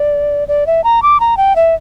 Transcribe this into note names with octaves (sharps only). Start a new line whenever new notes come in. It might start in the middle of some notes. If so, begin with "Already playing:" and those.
Already playing: D5
D5
E5
A#5
D6
A#5
G5
E5